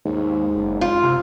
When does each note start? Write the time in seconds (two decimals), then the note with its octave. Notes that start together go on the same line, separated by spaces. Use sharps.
0.05 D#2 G#2
0.56 F#1
0.81 F4
1.03 C3